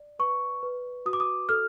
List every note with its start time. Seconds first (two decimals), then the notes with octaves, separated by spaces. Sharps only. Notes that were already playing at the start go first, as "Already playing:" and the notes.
Already playing: D5
0.19 B4 C#6
0.63 B4
1.06 F#4 D#6
1.13 D6
1.20 D#6
1.49 A4 F6